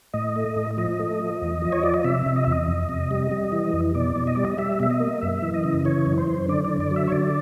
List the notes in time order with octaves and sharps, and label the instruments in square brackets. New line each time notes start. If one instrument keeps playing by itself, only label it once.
[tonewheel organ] A2 D#5
A3
A2
F3 D#5
A3
F3
E2
F3
C#5
F3 D5
D#5
C3 E5
C3
D#5
E2 E5
D#5
F2
C3
G3
G3
E3
F2
B2 D5
B2
D#5
G3 D5
D#5
G3 E5
B2 E5
D#5
A#3
F#2 E5
E3
D#5
C#3
E3 C#5
F#2
C5
F#2
D3 D5
D3 D5
D5
F#3
E5
C#5
D3 D5